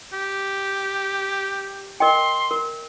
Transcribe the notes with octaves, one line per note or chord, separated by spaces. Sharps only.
G4
A#4 D#5 G5 C6
A#4